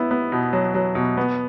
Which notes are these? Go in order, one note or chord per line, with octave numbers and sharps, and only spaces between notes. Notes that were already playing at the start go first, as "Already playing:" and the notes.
Already playing: B3 E4
B3
B2
F#3
F#3
B2
B3